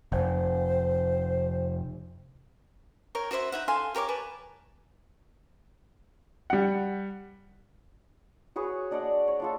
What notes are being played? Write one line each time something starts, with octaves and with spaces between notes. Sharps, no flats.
F1 C5
A#4 C#5 G5
F#4 B4 C5 E5
D#4 E5 F#5
A4 F5 G#5 C6
G4 A#4 C#5 D6
B4 G#5 A5
G3 F#5
F#4 G#4 B4 C#5
D4 D5 D#5 F#5
C#5
D4 F4 A4